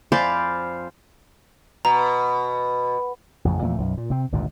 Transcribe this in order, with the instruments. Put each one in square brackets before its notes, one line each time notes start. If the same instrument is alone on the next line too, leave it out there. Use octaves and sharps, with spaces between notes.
[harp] F2 G#5 B5 [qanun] C5 D5 F5
[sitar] B2 [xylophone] A#5
[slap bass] A1 F2 C#3
E2 A#2 F3 A3
B1 F#2
A#2
C3 C4
G#1 D2 G2 A#2